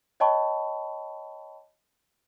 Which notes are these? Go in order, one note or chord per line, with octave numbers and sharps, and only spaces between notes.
C#5 D#5 G5 A5 B5 C#6